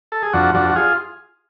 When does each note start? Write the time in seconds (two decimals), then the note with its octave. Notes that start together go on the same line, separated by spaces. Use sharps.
0.12 A4
0.23 G#4
0.33 F2 D4 F#4
0.55 F2 D4 F#4
0.70 F#4
0.75 F4 G#4